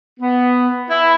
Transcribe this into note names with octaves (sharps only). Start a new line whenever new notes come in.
B3
E4